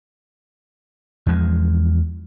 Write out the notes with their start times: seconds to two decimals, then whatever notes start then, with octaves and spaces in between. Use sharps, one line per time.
1.27 E2 F3 G#3